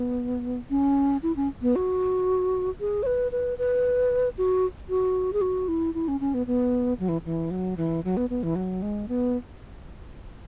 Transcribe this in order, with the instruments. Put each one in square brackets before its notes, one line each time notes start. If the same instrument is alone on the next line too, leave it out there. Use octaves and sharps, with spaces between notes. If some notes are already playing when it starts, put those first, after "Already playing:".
Already playing: [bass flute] B3
C#4
E4
C#4
B3
F#4
G#4
C#5
B4
B4
B4
F#4
F#4
G#4
F#4
E4
E4
C#4
C#4
B3
B3
F#3
E3
E3
F#3
E3
F#3
B3
B3
E3
F#3
G#3
B3